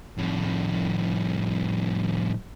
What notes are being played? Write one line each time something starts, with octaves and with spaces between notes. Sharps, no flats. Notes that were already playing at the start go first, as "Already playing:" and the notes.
F2 A2